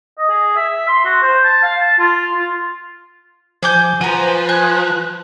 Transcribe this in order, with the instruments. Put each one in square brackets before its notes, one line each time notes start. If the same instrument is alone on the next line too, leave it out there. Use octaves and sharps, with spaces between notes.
[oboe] D#5
G#4
E5
C6
F#4
C5
A5
F5
A5
F4
F4
[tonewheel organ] F3 [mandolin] G#4 D6 G6
[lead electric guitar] F3 [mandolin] F#4 A#5 [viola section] B4 C5 [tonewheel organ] G#5
[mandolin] G#5 [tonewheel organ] F#6